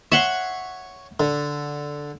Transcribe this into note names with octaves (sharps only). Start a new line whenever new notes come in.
C#5 E5 F#5 C6
D3